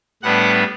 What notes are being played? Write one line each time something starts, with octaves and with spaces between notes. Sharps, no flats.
A2 G3 B3 D4 F#5